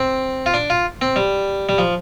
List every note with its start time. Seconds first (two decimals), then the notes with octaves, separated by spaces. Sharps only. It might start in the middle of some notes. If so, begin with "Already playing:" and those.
Already playing: C4
0.46 F4
0.54 D4
0.70 F4
1.01 C4
1.16 G3
1.69 G3
1.78 F3